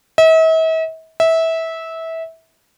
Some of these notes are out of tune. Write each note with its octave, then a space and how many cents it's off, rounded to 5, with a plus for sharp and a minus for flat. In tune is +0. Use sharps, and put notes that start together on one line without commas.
E5 -45
E5 -20